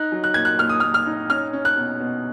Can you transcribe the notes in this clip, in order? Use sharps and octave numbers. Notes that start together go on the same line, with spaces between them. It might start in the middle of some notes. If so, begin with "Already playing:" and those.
Already playing: D#4 F#6
F#3
F#6
A#2 G#6
F#6
A#2 F6
D#6
A#2 F6
F6
D#4
C#4 F6
C#4
F#6
B2
B2